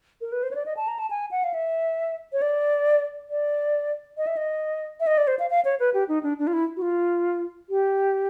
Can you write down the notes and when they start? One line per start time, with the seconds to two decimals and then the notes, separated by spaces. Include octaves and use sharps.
0.21 A#4
0.32 B4
0.43 C5
0.51 C#5
0.55 D5
0.66 D#5
0.77 A5
0.88 A#5
0.99 A5
1.10 G#5
1.31 F#5
1.44 F5
1.54 E5
2.33 C#5
2.42 D5
3.30 D5
4.17 D#5
4.27 E5
4.37 D#5
5.00 E5
5.07 D#5
5.18 D5
5.27 C5
5.39 F5
5.50 F5
5.65 C#5
5.80 B4
5.94 G4
6.09 D#4
6.23 D4
6.39 D4
6.47 F4
6.53 E4
6.77 F#4
6.82 F4
7.70 G4